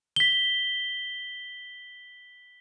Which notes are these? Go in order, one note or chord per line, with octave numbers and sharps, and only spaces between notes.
B6 G7